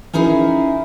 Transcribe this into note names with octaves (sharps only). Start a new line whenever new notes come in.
C#4 D#4 E4 G#4 A#4